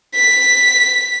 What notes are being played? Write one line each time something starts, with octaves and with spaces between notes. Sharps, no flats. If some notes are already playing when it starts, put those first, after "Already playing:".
B6